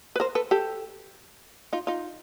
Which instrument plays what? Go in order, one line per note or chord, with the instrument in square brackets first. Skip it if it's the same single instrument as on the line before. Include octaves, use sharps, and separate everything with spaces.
[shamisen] B4
A#4 C5
A4 B4
G4 A4
D#4 F4
D#4 F4